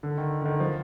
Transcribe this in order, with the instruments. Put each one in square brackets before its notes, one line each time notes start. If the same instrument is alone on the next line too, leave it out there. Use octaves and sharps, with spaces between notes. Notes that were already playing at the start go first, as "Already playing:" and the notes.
[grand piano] D3
D#3
D3
D#3
F3